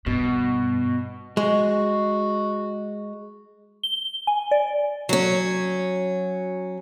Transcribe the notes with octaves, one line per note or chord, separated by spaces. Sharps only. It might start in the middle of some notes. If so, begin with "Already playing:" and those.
G2 B2
G#3 F#4
G7
G#5
D5
F#3 C#4